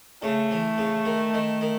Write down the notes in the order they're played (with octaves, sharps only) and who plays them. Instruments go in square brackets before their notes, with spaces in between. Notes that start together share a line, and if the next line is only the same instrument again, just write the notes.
[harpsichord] C#3 [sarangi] A3
[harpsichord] E3
C#3
D#3
D#3
D#3